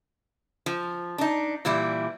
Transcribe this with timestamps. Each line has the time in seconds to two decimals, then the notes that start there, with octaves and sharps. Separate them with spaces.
0.66 F3
1.18 D4 D#4
1.65 A#2 E3 G3 E4